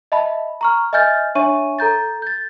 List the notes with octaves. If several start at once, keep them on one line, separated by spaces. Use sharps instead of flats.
D#5 E5 A5 B5
A#5 C#6 F6
D#5 E5 G#5 F6 G6 A6
D4 C#5 E5 G#5 C#6 D#7
A4 A#5 G6 A6
G6 A6